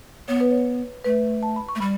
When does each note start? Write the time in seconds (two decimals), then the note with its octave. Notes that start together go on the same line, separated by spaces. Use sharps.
0.28 B3 C#5
0.40 B4
0.51 C#5
1.04 A3 B4
1.43 A5
1.56 B5
1.69 C#6
1.75 A3
1.80 G3 B5